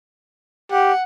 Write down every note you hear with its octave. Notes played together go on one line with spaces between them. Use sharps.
G4 F#5